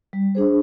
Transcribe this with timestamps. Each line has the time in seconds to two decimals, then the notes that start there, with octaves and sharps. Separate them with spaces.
0.13 G3
0.35 D4 G#4 C5